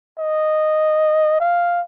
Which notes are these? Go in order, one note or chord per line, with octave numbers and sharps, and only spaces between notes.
D#5
F5